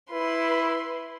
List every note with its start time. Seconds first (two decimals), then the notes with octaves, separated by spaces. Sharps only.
0.12 E4 B4 C6